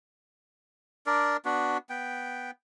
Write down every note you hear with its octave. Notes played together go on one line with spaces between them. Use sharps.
D4 A#4 D5
B3 D4 F#4
B3 G5